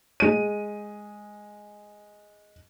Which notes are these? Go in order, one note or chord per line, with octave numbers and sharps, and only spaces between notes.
G#3 D#7